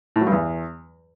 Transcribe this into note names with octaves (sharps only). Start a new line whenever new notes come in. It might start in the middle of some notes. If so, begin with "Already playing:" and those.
A2
F#3
G2
E2